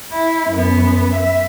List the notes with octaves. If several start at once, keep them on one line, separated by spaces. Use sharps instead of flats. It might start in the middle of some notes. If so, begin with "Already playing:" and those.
E4
F#2 B3
E5